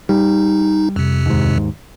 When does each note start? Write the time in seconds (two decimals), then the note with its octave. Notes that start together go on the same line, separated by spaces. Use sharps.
0.09 G3 D#4
0.96 F2 C3
1.26 D#2 G#2